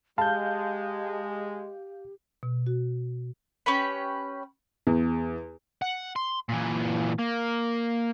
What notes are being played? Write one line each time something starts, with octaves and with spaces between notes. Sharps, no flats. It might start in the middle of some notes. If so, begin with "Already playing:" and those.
G#3 G4 F5 A5 G6
B2
F#4
C#4 G4 B4 B5
E2
F#5
C6
A#2 E3
A#3